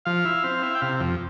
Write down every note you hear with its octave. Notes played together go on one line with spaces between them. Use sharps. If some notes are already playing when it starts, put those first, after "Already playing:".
F3 F5
E4
C4
E4
G5
C3 F5
F2